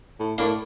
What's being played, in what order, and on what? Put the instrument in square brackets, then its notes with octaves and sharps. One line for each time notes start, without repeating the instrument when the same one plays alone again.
[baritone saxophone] A2
[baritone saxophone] A2 [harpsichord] A#3 D4